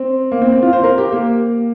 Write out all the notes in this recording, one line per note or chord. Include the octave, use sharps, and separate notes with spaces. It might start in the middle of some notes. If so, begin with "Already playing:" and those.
Already playing: C4
A#3
C4
C4
F4
C5
A#4
G4
A#3